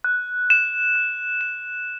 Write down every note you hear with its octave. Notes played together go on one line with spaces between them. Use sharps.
F#6
E7
F#6
E7